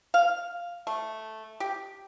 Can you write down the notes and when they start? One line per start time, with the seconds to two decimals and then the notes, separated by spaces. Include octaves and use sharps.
0.14 F5
0.87 A3
1.60 G4